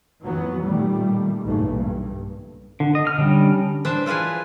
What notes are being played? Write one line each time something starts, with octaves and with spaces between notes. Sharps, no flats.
F2 E3 F#3 B3
A#2 D#3 G3 A3
F#1 B1 G#2 E3 A3 A#3
G2
D3
D#5
F6
D3 G3 C#4 D4
E3 D4 C5 E5 A5
E4 F4 G#4 B4 G#5